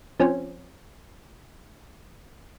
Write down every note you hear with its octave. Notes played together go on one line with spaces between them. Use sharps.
F3 C4 C#4